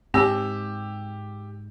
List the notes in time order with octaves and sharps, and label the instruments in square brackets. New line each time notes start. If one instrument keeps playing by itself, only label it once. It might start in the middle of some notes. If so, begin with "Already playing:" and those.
[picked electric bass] G#2 [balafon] C4 [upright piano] G4 E6